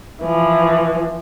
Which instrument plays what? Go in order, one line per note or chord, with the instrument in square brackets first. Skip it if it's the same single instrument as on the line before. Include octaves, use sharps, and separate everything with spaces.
[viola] E3 F3